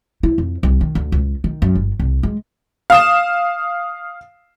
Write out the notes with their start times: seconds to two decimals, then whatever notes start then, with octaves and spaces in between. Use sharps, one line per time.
0.23 E4
0.38 F2
0.63 C2
0.81 D#3
0.95 D2
1.12 C#2
1.44 D#3
1.62 F#2
1.75 G1
1.99 C2
2.23 G#3
2.90 F5 D#6 E7